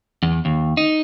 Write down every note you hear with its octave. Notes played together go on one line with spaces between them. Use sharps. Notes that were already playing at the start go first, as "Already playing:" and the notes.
E2
D#2
D#4